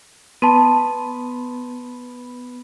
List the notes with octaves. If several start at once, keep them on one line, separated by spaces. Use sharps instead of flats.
B3 A5 C6 D#7